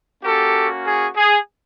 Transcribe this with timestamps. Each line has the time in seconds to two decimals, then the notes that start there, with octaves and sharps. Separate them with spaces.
0.23 A#3 C#4 F#4 G4 A4
0.85 G#4
1.16 G#4